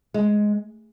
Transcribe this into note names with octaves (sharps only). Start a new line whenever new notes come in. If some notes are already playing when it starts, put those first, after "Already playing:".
G#3